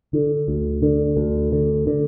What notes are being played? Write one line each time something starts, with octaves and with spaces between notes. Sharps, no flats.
D3
D2
D3
D2
D3
D3